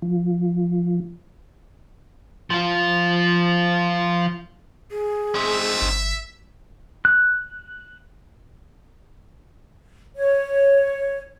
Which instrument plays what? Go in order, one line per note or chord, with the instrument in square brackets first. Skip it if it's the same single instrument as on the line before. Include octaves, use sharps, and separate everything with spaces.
[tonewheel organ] F3
[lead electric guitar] F3 F4
[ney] G#4
[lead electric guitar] C4 D#4 [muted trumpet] E5
[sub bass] G1
[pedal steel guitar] F#6
[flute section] C#5